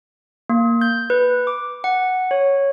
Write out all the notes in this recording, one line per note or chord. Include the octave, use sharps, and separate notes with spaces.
A#3
G6
B4
D6
F#5
C#5